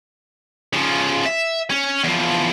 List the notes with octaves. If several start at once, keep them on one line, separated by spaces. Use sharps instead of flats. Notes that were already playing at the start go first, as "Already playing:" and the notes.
C#3 F3
E5
C#4
E2 F3